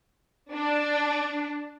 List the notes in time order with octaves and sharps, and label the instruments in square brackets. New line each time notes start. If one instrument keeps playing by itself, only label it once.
[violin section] D4